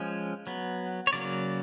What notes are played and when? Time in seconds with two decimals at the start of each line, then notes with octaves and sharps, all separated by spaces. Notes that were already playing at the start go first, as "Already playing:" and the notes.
Already playing: F3 G#3 C#4
0.47 F#3 B3
1.07 C#5
1.13 C#3 F#3 A#3 D5